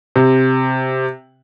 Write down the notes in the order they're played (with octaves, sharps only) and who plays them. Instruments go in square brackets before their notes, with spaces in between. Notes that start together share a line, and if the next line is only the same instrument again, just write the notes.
[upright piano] C3